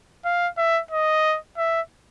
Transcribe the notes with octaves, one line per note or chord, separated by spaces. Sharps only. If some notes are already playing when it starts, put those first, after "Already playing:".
F5
E5
D#5
E5